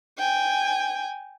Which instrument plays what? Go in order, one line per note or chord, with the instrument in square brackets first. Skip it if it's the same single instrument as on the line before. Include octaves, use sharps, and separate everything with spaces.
[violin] G5 G#5